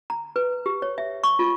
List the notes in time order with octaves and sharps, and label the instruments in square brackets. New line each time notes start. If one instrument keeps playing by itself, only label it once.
[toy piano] A#5
B4
G4
C#5
E5
C#6
F4